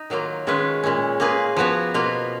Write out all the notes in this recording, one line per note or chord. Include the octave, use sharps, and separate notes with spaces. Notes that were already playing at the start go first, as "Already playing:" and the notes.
Already playing: D#4
D#3 F#3 A#3 F4
D#3 G#3 C#4 F4 B4
A#2 G#3 C#4
A#3 F4 G#4 B4
F3 B3 F#4 C#5
B2 A#3 F4